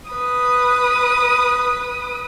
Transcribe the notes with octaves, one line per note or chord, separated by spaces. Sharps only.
B4 D#6